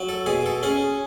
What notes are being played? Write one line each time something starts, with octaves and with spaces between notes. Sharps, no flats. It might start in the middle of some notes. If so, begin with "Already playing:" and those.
Already playing: F#3
A4
B2 G#4
A4
C#4 G#4